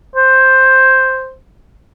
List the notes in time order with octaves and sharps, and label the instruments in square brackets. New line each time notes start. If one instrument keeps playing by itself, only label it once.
[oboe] C5